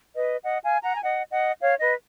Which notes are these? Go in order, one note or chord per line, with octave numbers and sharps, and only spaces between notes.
B4 D#5
D#5 F#5
F5 G#5
F#5 A#5
G#5
D#5 F#5
D#5 F#5
C#5 F5
B4 D#5